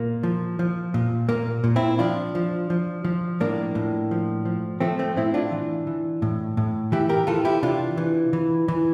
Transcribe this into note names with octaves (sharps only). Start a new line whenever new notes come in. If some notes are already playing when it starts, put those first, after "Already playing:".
Already playing: A#2 A#3
F3
F3
A#2
A#2 A#3
A#2
C4 E4
F3 D4 F4
F3
F3
F3
A2 A#3 D4
A2
F3
F3
F3 A3 C4
A3 C4
A2 C4 E4
D4 F4
E3
E3
A2
A2
E3 E4 G4
G4 A#4
E3 F4 A4
E4 G4
C3 D4 F4
E3
E3
E3